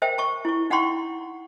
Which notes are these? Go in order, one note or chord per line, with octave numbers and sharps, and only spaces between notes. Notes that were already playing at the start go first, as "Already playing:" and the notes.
A#4 C5 E5 G5 A5
A5 C#6
E4 C#6
D#4 F#5 G5 A#5 C6 C#6